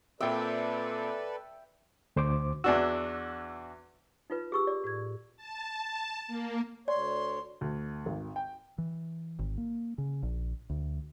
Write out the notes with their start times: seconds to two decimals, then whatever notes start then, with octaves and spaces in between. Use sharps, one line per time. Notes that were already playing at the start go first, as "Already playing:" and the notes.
0.20 A#2 C4 A4 B4 D5 E5 G5
2.16 D2 C5 D6
2.64 E2 D4 F#4 E6
4.30 D#4 F4 B4
4.52 G4 G#4 C#6 E6
4.67 D5
4.84 A2 G#6
5.37 A5
5.82 A5
6.28 A#3
6.88 D2 C#5 D5 C6
7.61 D2
8.06 G#1
8.36 G5
8.78 E3
9.39 G#1
9.58 A#3
9.98 C#3
10.23 A#1
10.70 D2